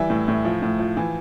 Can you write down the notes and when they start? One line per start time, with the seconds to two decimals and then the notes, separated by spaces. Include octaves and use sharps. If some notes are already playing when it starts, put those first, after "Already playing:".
Already playing: E3 G3 E5
0.10 A2
0.28 A2
0.45 F3
0.62 A2
0.79 F3
0.97 E3